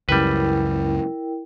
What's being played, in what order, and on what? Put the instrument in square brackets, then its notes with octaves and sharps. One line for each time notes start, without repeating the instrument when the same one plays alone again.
[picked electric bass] C#2 F#2 C#3 [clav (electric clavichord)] G3 B4 [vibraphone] E4 A#4 G5